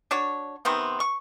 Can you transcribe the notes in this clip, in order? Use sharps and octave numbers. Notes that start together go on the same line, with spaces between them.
D4 F#4 C#5
C3 D#3 B3 C4
C#6